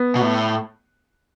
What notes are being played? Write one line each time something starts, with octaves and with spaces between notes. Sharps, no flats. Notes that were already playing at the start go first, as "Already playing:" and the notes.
Already playing: B3
B2
A2